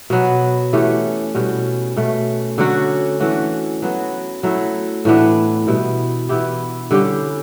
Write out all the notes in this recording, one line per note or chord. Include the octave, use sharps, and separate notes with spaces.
B2 F#3 B3
E3 A3 C#4 G4
B2 G3 C#4 F#4
B2 A3 C#4
D3 F#3 C#4 F#4
E3 A3 C#4 F#4
F#3 B3 F#4
F#3 A3 E4
A2 E3 B3 D4
B2 G3 B3 E4
E3 B3 E4 G4
D3 G3 C#4 G4